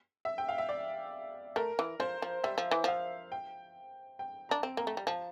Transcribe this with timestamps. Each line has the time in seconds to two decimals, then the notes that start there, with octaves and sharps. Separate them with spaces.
0.25 E5
0.38 G5
0.49 F5
0.58 E5
0.69 D5
1.56 A3 A#4
1.79 E3
2.00 F3 C5
2.22 F3
2.44 G3 E5
2.58 F3
2.71 E3
2.84 F3 F5
3.32 G5
4.19 G5
4.49 D4 A#5
4.63 C4
4.77 A#3 A#5
4.87 A3
4.97 G3
5.07 F3 A5